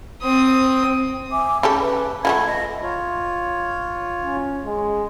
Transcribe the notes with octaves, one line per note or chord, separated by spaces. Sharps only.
C4 D#6
E5 G#5 D6
C#3 G4 A4 B5
B4
F3 G#3 A3 F#5 B5 G#6
D#5 E5
F4 C#5
C#4
G#3